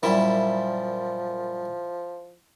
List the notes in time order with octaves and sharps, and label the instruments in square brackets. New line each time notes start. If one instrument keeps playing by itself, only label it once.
[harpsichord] F#2 A#2 G3 [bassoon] F3 [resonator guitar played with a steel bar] E4